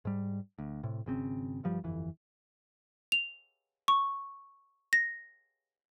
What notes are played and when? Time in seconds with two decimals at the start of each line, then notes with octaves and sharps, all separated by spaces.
0.05 G#2 G3
0.59 D2
0.84 A2 C3
1.06 G#1 C#3 C4
1.63 G1 G2 F3 G3
1.84 G1 F2 E3
3.12 F7
3.88 C#6
4.93 A#6